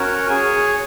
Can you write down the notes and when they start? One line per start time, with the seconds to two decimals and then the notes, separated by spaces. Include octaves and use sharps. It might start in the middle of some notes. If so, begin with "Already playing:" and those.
Already playing: C#4 F#4 A#4 C#5
0.27 G#4 C#5 G#5